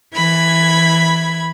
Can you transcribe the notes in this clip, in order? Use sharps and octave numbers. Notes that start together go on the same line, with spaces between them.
E3 B5 G#6